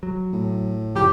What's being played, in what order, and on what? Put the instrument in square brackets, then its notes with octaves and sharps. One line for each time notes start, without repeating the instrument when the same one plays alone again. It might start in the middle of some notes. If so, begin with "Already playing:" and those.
[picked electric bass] F#3
[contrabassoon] A2
[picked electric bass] F#2 C#3 F3 [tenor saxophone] G4